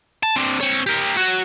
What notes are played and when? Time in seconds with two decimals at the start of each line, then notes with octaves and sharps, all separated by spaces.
0.23 A5
0.36 C4 D4
0.61 C4 C#5
0.87 G4 A#4
1.17 F#4 C#5